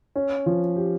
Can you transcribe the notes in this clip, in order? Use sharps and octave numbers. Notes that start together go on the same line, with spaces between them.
C#4
F3
G4